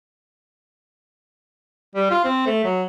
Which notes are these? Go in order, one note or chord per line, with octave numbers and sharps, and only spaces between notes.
G3
F4
C4
A3
F#3